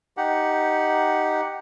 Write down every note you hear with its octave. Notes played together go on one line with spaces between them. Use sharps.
D#4 G4 F#5